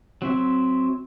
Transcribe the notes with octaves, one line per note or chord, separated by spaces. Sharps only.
F#3 C4 E5